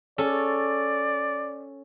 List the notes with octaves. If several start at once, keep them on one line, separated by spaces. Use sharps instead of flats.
C#4 A4 D5